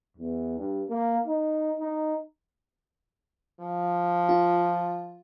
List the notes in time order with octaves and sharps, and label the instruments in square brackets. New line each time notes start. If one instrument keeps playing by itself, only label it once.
[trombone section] E2
G2
A#3
D#4
D#4
[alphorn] F3
[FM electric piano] F4